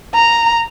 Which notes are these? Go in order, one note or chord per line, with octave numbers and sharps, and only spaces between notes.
A#5